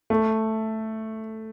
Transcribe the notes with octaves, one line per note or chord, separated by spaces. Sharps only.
A3